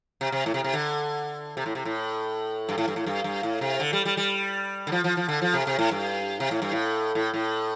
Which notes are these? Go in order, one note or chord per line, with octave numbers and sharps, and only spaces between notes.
C3
C3
A2
C3
C3
D3
C3
A2
C3
A2
G2
A2
G2
A2
G2
G2
A2
C3
D3
G3
G3
G3
D3
F3
F3
F3
D3
F3
C3
C3
A2
G2
C3
A2
G2
A2
A2
A2